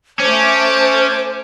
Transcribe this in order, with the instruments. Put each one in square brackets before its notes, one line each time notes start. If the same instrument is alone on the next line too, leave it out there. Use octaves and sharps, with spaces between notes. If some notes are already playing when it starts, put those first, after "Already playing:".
[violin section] A3 A5 D6 [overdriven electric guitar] C#4 [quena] C5